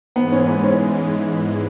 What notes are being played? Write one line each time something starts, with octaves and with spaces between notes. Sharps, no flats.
G#2 E3 G#3 B3
C#4
B3
C#4